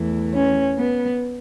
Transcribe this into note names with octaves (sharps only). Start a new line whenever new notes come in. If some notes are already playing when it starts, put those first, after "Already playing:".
Already playing: E2 E3 A3
C#4
B3